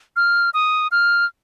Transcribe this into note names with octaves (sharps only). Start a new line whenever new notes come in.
F6
D#6
F6